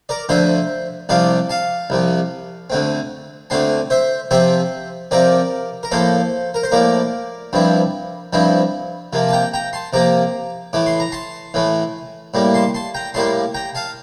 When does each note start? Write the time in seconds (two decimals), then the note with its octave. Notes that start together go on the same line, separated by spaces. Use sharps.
0.09 A#4 D5
0.29 D2 D3 F3 C5 E5
1.09 C2 C3 F3 D5 F5
1.49 F5 A5
1.90 C2 C3 F3
2.70 D2 D3 A3 C4
3.50 D2 D3 A3 C4 A5 C6
3.90 C5 E5
4.31 C3 F3 C4 C5 E5
5.11 C3 F3 C4 A#4 D5
5.83 A#4
5.91 A2 F3 A#3 A4 C5
6.54 A#4
6.63 C5
6.71 A2 F3 A#3 A#4 D5
7.53 G2 F3 C4 E4
8.33 G2 F3 C4 E4
9.13 C3 F3 A#3
9.29 A5
9.33 G5 A#5
9.54 G5 A#5
9.73 A5 C6
9.93 C3 F3 A#3 A#5 D6
10.73 A2 E3 A3 D6
10.86 C6
11.00 A#5
11.12 A5 C6
11.54 A2 E3 A3
12.34 A2 G3 A#3
12.54 A5 C6
12.75 A5 C6
12.95 G5 A#5
13.14 A2 G3 A#3 A5 C6
13.54 G5 A#5
13.75 F5 A5